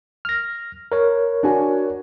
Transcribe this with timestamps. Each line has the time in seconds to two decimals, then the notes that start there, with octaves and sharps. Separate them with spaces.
0.25 F6 A#6
0.92 A#4 C#5
1.43 D4 F#4 G#5